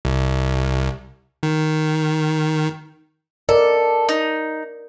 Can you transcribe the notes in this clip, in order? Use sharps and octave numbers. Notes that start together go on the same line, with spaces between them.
C2
D#3
A4 A#4 D5 D#5
D#4